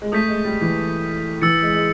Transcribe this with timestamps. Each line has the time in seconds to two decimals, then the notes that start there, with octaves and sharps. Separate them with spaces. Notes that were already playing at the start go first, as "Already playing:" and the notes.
0.02 G#3
0.12 A3 D#6 G6 B6 D#7
0.28 G#3
0.45 G3
0.61 E3
1.41 E3 E6 A6 C#7
1.62 G#3
1.74 G#3